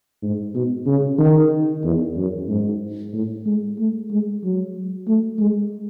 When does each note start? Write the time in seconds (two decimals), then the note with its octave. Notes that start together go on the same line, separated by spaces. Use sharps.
0.23 G#2
0.55 B2
0.87 C#3
1.19 D#3
1.84 E2
2.17 F#2
2.48 G#2
3.13 A2
3.46 G#3
3.79 A3
4.11 G#3
4.44 F#3
5.08 A3
5.40 G#3